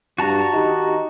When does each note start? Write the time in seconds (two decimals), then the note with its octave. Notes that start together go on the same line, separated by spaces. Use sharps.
0.18 G2 F#4 A5 A#5
0.54 D#3 D#4 G4